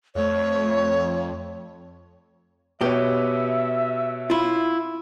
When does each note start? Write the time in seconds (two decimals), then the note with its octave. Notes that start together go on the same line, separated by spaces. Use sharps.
0.15 F2 A3 C#5
2.81 B2 G4 B4 C#5 E5
4.30 E4 F4